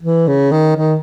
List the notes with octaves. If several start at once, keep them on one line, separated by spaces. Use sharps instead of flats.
E3
C#3
D#3
D#3